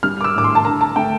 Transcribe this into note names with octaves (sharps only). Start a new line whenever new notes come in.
G3 F6
D6
E6
A2 D6
C6
A5
D3 A#5
A5
A3 G5